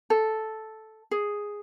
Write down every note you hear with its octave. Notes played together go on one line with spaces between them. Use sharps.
A4
G#4